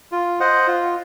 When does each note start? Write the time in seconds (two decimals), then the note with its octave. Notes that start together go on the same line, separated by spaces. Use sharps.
0.12 F4
0.40 C5 D#5 F#5
0.67 F4